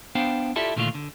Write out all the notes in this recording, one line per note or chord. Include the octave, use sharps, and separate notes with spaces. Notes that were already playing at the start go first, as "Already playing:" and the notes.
B3 D4 C5 F5 G5
E4 F4 G4 A4 D5 E5
A#2 D3 D#3 A3 D4 F4
D3